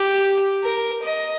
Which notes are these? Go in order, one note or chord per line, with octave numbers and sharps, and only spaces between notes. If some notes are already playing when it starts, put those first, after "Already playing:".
Already playing: G4
A#4
D#5